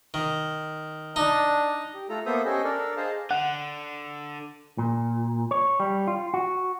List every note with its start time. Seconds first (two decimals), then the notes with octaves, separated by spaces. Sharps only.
0.14 D#3
1.16 D4 D#4
1.94 G4
2.09 A3 F4 A4 A#5
2.26 A#3 B3 A4 C5 E5 D#6
2.45 C#4 G4 A4 C5 D#5 G#5
2.64 D4 A4 A#4 D5
2.97 G#4 C5 D#5 F5 A5
3.31 D3 F#5
4.78 A#2
5.51 C#5
5.80 G3
6.08 F4
6.34 F#4